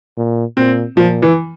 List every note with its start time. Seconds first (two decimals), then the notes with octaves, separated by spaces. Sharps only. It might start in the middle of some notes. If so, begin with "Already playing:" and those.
0.17 A#2
0.57 A#2 C4
0.97 A#2 F3
1.22 E3